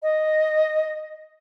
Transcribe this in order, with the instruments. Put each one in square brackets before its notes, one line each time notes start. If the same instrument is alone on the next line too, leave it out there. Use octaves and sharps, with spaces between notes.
[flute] D#5